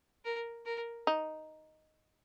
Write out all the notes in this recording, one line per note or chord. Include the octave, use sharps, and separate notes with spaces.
A#4
A#4
D#4